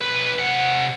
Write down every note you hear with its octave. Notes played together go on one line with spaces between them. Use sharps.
B1 B4
C3 F#5